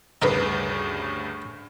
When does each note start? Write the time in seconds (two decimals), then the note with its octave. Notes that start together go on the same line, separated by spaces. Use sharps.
0.22 D2 G2 C#3 D#4 A#4 B4